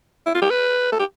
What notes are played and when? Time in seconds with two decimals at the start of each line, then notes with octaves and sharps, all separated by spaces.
0.26 E4
0.35 F4
0.42 G4
0.50 B4
0.92 A4
0.99 G4